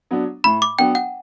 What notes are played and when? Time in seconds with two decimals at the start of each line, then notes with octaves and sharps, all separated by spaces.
0.11 F#3 B3 D4
0.44 A2 B5
0.62 D6
0.79 F#3 B3 D4 G5
0.95 F#5